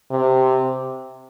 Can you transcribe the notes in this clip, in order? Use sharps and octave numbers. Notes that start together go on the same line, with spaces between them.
C3